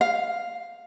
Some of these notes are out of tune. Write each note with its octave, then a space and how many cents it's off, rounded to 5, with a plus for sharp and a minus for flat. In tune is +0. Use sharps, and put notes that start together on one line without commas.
F5 +0